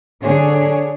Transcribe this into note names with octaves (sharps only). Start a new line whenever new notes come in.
D3 D4 G#4 C#5